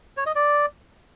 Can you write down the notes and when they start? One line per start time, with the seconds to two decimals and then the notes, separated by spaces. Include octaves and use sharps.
0.17 C#5
0.26 D#5
0.35 D5